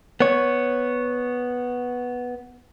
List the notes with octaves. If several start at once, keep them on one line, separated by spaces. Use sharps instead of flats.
B3 C#5